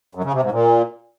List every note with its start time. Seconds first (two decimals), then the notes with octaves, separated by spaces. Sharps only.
0.15 F#2
0.24 C#3
0.33 C3
0.42 G#2
0.52 A#2